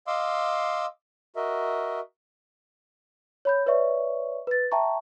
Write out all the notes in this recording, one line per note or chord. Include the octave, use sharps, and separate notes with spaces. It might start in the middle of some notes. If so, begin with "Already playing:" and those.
D#5 F5 C6 D6 E6
F#4 A#4 D#5 E5
C#5 B5 G6
B4 C#5 D5 E5 C#6
B4 A6
E5 G5 A5 A#5 C#6